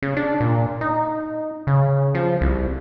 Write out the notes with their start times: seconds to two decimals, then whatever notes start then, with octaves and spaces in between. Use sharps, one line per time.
0.02 C#3
0.17 D4
0.40 A#2
0.81 D#4
1.67 C#3
2.15 F3
2.41 C2